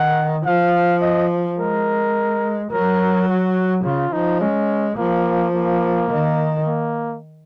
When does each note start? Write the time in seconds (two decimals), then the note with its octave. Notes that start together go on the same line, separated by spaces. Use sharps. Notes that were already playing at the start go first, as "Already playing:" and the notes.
Already playing: D#3 F#5
0.45 F3 F5
1.02 D#5
1.59 G#3 A#4
2.72 F#3 A#4
3.28 F#4
3.85 C#3 F4
4.13 F3 D#4
4.40 G#3 C#4
4.97 F3 A#3
5.54 A#3
6.10 D#3
6.66 A#3